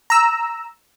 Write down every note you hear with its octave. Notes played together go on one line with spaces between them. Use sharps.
A#5 E6